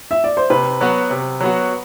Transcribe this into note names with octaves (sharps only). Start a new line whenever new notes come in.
E5
D5
C5
C3 B4
F#3 B3 F#4
C3
F#3 B3 F#4